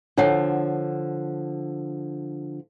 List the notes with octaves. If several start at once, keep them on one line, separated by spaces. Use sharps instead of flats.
D3 F3 D4 C#5 F#5